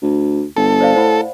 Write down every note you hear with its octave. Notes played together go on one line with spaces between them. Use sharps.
D2
G1 A4
C5 D5 F5
A2 C5 F#5 B5